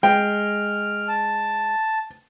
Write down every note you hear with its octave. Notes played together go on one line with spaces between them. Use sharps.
G#3 G5 F6
A5